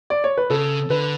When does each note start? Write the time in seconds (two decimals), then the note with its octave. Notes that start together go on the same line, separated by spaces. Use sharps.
0.10 D5
0.24 C#5
0.37 B4
0.50 C#3 A4
0.90 D3 B4